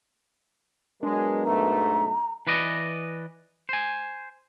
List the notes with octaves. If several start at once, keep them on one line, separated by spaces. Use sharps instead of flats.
F#3 G#3 B3 D4 A#4
B1 G#2 A3 A#5
E3 B4 D5 D#5
C5 G#5